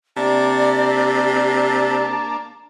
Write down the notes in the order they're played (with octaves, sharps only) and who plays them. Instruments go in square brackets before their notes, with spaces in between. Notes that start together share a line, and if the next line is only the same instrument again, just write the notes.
[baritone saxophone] C3 [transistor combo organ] A#3 D4 [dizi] D5 [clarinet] A5